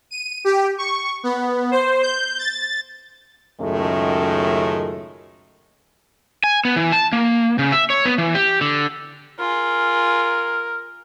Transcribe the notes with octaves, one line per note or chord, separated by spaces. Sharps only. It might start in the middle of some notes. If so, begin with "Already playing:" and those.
D#7
G4
C#6
B3
C5
G6
A6
C#2 F#2 A2 D#3 G#3 A3
G#5
B3
E3
A5
A#3
C#3
E5
C#5
B3
E3
G4
D3
F4 G#4 A#4